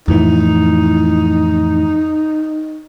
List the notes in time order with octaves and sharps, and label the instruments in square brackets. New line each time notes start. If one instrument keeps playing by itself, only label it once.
[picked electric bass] F2 A2 E3 [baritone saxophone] D#4